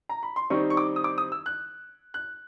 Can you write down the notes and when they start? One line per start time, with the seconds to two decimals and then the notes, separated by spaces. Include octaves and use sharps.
0.09 A#5
0.23 B5
0.36 C6
0.50 D#3 G3 C4 D#4 C#6
0.70 C#6
0.77 D6
0.96 D#6
1.04 D6
1.18 D#6
1.32 E6
1.46 F#6
2.14 F#6